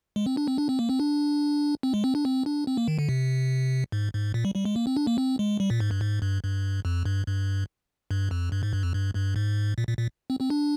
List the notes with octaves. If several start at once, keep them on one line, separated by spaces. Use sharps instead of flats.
G#3
C4
D4
C4
D4
C4
A#3
C4
D4
C4
G#3
C4
D4
C4
D4
C4
A#3
D#3
D3
C3
G#2
G#2
A#2
G3
G3
G#3
A#3
C4
D4
A#3
C4
G#3
G3
A#2
G#2
G2
G#2
G2
G2
F2
G2
G2
G2
F2
G2
G#2
G2
F2
G2
G2
G#2
A#2
A#2
A#2
C4
C4
D4